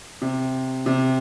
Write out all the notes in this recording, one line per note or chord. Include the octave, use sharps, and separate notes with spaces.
C3
C3